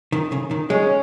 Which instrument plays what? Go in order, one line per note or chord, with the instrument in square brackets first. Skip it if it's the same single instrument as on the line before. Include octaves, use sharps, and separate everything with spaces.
[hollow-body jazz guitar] D#3
C#3
D#3
[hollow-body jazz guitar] G#3 [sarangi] C#4